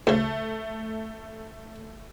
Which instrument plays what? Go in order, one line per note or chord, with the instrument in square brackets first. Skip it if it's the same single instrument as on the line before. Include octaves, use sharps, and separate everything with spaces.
[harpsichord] D2 C#3 [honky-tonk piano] A3